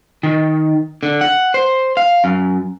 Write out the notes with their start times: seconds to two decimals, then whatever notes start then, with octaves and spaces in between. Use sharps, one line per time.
0.23 D#3
1.03 D3
1.21 F#5
1.54 C5
1.97 F5
2.24 F#2